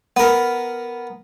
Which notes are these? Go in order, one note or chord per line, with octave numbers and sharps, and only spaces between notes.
B3 A#4